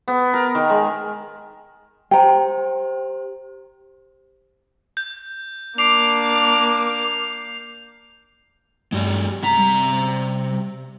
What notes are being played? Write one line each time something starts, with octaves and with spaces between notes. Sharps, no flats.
B3
A#4
D#3
G#3
G4 C5 G5 A#5
G6
A#3 D4 D6 C7 F7
G2 G#3 G4
C3 A#5 B6
G3